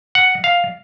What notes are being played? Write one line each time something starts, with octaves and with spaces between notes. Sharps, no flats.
F#5
F5